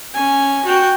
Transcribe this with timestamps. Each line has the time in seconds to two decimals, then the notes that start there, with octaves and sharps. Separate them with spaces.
0.14 C#4 G#5
0.65 F#4 G5